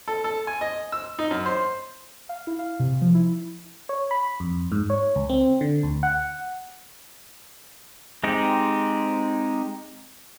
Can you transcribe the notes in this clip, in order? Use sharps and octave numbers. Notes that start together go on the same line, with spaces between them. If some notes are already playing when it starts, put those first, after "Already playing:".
A4
A4
G#5
D#5
E6
D#4
F#2
C5
F5
E4
F5
C3
F3
E4
C#5
B5
F2
G#2
C#5
C#2
C4
D3
D2
F#5
G#3 C4 D#4 G4